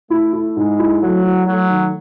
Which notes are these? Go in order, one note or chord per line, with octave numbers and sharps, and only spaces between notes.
A3 E4
E4
G#2 G#3
E4
F#3 A3
E4
F#3 A3
D#3